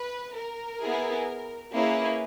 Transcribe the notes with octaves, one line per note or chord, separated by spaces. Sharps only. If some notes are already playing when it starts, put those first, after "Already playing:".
Already playing: B4
A#4
B3 E4 G#4
A#3 C#4 E4 G#4 B4